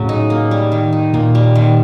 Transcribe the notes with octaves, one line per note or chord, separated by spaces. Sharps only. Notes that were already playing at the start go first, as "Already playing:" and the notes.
Already playing: A2 C#3 F#3
D#4
A#3
G3
D#3
D#4
A#2 A#3
G3
D#3